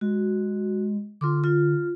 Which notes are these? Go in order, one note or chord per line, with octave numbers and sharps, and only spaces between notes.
G#3 F#4
D3 F4 C6 D6
F4